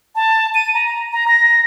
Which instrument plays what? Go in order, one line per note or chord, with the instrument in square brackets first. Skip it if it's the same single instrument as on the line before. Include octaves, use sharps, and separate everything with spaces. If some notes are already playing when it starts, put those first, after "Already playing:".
[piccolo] A5
D#7
A#5
A#5
A#6